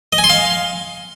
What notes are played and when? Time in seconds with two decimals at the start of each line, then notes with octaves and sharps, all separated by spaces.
0.13 D#5
0.18 G#5
0.24 C6
0.30 F5